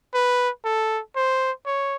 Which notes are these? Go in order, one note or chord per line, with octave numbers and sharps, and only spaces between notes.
B4
A4
C5
C#5